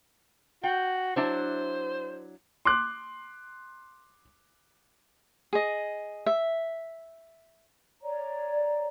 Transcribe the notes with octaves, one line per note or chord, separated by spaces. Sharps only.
F#4 G5
F#3 D4 E4 C5
C6 D6 F#6
G#4 D#5
E5
C#5 D5 A#5